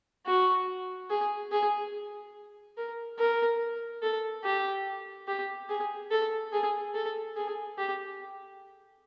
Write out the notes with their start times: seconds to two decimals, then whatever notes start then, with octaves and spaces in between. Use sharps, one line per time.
0.26 F#4
1.10 G#4
1.52 G#4
2.77 A#4
3.19 A#4
4.02 A4
4.44 G4
5.28 G4
5.69 G#4
6.10 A4
6.53 G#4
6.94 A4
7.36 G#4
7.78 G4